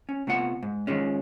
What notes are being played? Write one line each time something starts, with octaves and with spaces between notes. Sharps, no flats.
C#4
C3 A3 B3 F4 C#5 F#5
G#2
D#3 F3 G#3 C#4